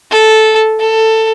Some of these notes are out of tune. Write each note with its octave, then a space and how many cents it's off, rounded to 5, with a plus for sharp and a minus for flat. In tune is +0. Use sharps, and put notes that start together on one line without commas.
A4 -10
A4 +15